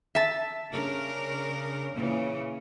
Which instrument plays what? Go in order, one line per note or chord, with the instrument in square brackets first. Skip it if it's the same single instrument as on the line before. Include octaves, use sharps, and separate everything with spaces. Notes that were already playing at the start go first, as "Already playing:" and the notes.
[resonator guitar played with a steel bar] E5 A5
[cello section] C#3 D4 A#4
A#2 C#3 E3